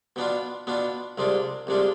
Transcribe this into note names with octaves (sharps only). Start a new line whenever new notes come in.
B2 B3 D4 F4
B2 B3 D4 F4
C2 C3 G#3 D4 F4
C2 C3 G#3 D4 F4